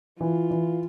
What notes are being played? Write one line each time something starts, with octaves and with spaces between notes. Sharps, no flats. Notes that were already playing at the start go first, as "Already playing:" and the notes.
E3 F4
E3